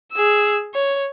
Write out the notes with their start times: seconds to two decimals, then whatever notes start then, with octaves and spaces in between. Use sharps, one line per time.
0.13 G#4 E6
0.74 C#5